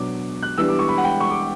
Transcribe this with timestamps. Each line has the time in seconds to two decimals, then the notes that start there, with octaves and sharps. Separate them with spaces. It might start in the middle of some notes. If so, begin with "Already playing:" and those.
Already playing: B2 F#3 D4 D6
0.42 F#6
0.58 E3 G3 B3 D4 E6
0.68 D6
0.79 C#6
0.88 B5
0.98 F#5
1.04 G5
1.20 C#6
1.30 D6